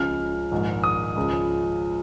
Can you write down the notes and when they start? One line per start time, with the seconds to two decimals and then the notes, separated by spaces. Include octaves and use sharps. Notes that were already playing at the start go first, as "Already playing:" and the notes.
Already playing: C#2 C#3 F3 F6
0.51 A#1 G#2 D#3
0.84 D#6
1.16 C#2 C#3 F3